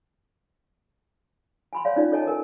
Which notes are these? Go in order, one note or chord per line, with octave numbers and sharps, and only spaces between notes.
G#5 B5 C6
C#5 D5 F5
C#4 D#4 F4 D5
A4 C#5 D#5 G#5 A5
A4 A#4 G#5